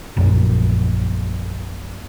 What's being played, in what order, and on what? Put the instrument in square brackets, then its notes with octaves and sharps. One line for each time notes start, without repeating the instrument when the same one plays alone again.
[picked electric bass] A#1 F#2 A#2